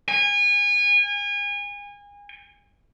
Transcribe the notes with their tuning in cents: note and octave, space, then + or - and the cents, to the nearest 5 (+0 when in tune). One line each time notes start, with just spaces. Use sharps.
G#5 -30